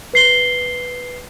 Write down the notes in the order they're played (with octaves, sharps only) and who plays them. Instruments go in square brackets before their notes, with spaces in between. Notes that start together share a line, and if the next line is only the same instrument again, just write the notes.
[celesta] B4 C7 G7